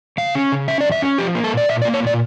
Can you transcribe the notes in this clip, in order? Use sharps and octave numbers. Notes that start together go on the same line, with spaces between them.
C#3 F5
C#4
C#3
C#4 E5
F2 D5
E5
C#4
F3 G4
A#3
A4
A#2 D5
A#2 E5
D5
A#3
C#5
A#2 D5